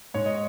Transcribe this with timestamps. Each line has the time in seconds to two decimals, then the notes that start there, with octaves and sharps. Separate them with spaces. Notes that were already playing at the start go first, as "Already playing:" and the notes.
0.14 G#2 C#5
0.26 D#5